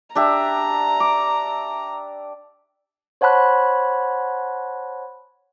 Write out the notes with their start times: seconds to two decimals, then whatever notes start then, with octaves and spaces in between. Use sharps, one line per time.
0.15 D4 G4 E5 A#5
1.00 D6
3.21 C5 C#5 F#5 A5 B5 F#6